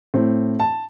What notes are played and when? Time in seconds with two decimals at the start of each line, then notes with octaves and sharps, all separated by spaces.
0.14 A2 C4
0.60 A5